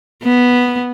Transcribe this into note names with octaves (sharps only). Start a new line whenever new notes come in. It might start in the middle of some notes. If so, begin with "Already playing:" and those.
B3